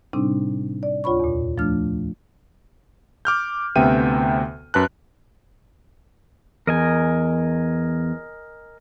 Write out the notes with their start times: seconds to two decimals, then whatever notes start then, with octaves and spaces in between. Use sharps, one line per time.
0.13 A2 C3 G3 C4 D4 D#4
0.83 D5
1.04 D2 F4 C#5 B5 C#6
1.20 E2 A#2
1.58 F3 A3 D4 F6
3.25 D6 F6 G6
3.76 D2 C3 B3 E5 G5 D#7
4.74 F#2 B4 A5 F#6
6.67 E2 A#4 D#5 G#5